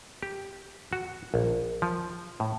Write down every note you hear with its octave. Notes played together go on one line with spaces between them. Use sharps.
G4
F#4
A#1
F3
A2